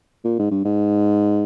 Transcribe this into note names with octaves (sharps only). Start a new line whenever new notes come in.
A#2
G#2
G2
G#2